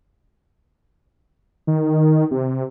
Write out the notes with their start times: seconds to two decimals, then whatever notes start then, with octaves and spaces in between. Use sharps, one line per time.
1.67 D#3
2.31 C3